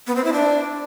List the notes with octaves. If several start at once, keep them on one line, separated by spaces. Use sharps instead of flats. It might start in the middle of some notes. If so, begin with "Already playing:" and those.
B3
C4
E4
D4